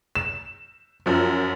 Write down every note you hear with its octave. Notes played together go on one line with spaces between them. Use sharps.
E7
F#2 F3